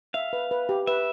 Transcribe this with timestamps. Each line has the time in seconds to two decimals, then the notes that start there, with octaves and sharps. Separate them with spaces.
0.14 E5 F5
0.33 B4
0.51 B4
0.69 G4
0.87 B4 E5